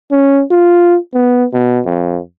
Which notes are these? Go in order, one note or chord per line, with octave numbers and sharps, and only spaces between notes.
C#4
F4
B3
B2
F2